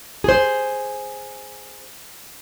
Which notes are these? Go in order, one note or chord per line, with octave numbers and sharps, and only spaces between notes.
G#4 C5